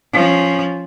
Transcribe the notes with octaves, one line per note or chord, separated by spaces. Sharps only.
F3 C#4